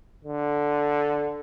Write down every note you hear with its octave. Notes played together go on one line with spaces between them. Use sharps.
D3